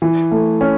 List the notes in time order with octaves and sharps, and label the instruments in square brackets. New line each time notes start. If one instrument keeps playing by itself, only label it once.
[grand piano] E3
A3
C#4